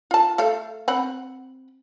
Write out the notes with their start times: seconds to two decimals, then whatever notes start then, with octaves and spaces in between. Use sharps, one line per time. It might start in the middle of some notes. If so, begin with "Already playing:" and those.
0.11 F4 A5
0.38 A3 A4 F5
0.88 C4 F#5 B5